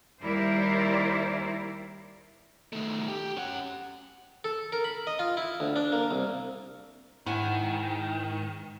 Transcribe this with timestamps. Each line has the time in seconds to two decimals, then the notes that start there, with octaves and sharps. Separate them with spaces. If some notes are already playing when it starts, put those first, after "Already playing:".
0.22 D#2 G3 E4 A#4 C5 D5
2.73 D#3 A3
3.08 G4
3.37 C#4 F#5
4.44 A4
4.72 A#4
4.84 B5
5.07 D#5
5.19 F4
5.37 E4
5.60 D2
5.76 D4
5.92 A#3
6.11 C2
7.26 G#2 D#3 E4 F#5 G#5